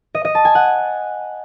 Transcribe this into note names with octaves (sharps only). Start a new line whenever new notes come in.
D#5
D#5
A5
G#5
F#5